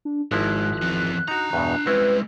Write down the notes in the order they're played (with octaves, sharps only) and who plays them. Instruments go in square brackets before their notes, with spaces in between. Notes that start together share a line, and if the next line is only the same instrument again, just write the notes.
[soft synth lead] D4
[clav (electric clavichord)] G#1 F3 E4 [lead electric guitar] G#2 [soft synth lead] F#6
[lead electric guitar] F2 E3
[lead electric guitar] D4 A#5 [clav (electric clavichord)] D#4 F#4
[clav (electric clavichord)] E2 G2 B2
[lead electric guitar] G3 G#3 [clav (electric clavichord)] C4 C#4 E4 [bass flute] B4